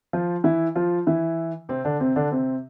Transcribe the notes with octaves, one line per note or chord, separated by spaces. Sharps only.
F3 F4
E3 E4
F3 F4
E3 E4
C3 C4
D3 D4
C3 C4
D3 D4
C3 C4